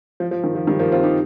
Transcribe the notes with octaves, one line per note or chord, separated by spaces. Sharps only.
F3
F3
D#3
F3
D#3 G3
F3 A#3
C4 F4
D#4 G4